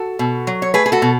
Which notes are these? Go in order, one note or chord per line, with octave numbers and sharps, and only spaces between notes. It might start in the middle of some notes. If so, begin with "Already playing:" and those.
Already playing: F#4 A4
B2
F#3
C#5
A3 G#4 B4
G#4
F#4 A4
B2